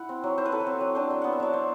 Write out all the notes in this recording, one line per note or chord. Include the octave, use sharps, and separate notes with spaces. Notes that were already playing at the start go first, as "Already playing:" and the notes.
Already playing: E4 F#5
C4
F#3
E4 C5
B4
F#3 A4
B4
C4
F#3
D4 C5
F#3 G5
B3 F#5
E5
F#3 D5
D4 C5